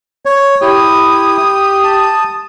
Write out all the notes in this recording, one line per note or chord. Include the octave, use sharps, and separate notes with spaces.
C#5
E4 G4 D#6
A5